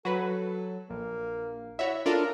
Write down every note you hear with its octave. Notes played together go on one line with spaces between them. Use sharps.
F#3 F#4 A4 B4
A#1 A#3
E4 F#4 C#5 E5
D4 F4 A4 A#4 D5